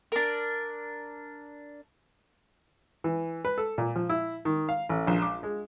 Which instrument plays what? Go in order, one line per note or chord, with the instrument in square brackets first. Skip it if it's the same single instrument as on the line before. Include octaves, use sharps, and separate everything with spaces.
[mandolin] D4 A#4
[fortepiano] E3
B4
A4
A#2
F3
E4
D#3
F5
A1
A#1
D6
G#3